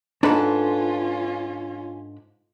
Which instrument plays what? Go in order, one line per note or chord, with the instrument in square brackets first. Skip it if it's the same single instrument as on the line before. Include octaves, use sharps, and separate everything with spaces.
[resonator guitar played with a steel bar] G#2 A4 [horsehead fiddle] C#4 F4 [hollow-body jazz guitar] D4 B4 A#5